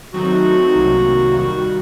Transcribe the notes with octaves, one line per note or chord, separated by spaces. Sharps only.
D#3 F#3 A3 C4 D#4 F#4
C2 C3 D#3 F#3 A#3
D#2 D#3 G3 F#4